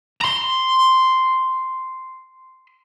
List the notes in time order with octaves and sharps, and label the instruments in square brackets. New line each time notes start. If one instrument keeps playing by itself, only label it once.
[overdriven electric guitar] A#5 C6